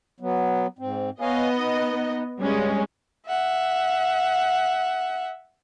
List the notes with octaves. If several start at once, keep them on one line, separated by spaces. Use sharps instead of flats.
F#3 B3
G#2 C4
B3 C#5 D#5 F5 G#5
D#4
G2 C#3 G3 G#3 C#4
E5 F#5